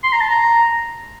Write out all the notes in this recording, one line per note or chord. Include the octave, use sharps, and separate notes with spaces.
C6
A#5
A5
A#5